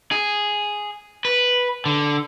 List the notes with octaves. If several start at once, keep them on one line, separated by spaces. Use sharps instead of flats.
G#4
B4
D3